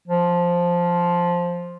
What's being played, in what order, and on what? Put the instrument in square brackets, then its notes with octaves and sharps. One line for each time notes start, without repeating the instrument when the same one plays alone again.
[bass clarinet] F3